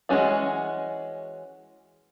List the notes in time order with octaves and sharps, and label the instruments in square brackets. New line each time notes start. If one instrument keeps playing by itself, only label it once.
[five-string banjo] E3 G#3 C4 C#4 F#4